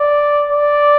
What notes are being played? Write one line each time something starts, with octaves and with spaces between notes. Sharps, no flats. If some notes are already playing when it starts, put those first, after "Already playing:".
Already playing: D5
D5